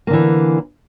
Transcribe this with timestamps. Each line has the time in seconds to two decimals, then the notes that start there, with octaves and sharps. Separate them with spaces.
0.07 A#3
0.10 D3
0.13 E3